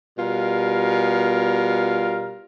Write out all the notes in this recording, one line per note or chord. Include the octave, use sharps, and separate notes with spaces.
B2 G3 F4 A#4